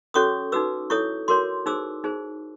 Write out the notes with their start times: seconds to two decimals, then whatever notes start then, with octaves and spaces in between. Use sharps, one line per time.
0.14 C#4 F#4 A4 C#5 C#6 D#6
0.52 D#4 F#4 B4 D6 E6
0.90 E4 A4 C#5 C#6 D#6
1.28 F#4 A#4 C#5 C6 D6
1.66 D#4 G#4 C5 D6 E6
2.04 D#4 G#4 C5